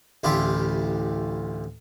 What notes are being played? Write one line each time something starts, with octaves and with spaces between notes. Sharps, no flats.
A1 D2 E4 F4 G4 E5